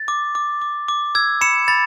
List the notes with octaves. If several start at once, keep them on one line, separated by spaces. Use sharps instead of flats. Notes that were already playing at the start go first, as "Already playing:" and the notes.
Already playing: A6
D6
D6
D6
D6
E6 G#6
B5 C#7 E7
B5 A6